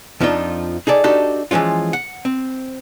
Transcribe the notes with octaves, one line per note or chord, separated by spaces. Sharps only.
F2 F3 D4 D#4 F4
D#4 G#4 A4 D5
D4 D#4 F#4 G4 A4
E3 F3 G#3 C#4 F4
F#5
C4